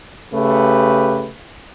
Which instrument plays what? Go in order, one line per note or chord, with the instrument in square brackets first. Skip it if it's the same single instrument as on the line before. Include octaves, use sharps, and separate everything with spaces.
[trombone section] C#3 A3 G4 B4